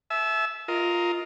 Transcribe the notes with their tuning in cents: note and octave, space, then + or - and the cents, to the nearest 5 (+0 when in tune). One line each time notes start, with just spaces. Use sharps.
E5 +0 A5 -45
F4 +0 A#4 +0 D#5 +20